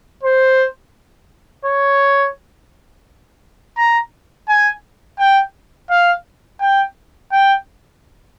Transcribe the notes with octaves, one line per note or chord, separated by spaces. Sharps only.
C5
C#5
A#5
G#5
G5
F5
G5
G5